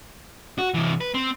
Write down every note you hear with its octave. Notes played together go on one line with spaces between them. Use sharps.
F#4
C3 E3
B4
C4